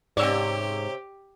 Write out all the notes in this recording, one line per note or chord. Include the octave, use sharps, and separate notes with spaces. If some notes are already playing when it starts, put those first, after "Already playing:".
G#2 C3 G4 C#5 D5 E6